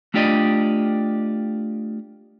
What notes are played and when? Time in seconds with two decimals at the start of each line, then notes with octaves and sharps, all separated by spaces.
0.14 A3 D4 F4 G4 D5 D#5